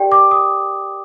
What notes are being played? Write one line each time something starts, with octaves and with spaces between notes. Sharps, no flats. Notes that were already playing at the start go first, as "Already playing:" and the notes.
Already playing: G4 A#4 D5 G5
D6
D#6